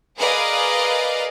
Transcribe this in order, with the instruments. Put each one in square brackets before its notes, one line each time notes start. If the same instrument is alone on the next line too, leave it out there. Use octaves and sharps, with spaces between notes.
[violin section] G#4 A#4 B4 D5 D#5 F5